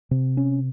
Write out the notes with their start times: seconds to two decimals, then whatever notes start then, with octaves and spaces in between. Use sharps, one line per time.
0.11 C3
0.37 C#4